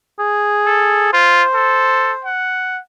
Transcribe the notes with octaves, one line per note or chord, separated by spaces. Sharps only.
G#4
A4
F4 C5
A4
F#5